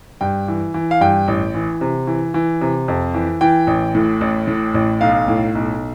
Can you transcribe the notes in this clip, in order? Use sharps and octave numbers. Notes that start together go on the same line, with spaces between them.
G2 G5
E3
E3
F5
G2 G5
A1
E3
C3
E3
E3
C3
F2
E3
E3 G5
A1
A2
A1
A2
A1
B1 F5
A2
B1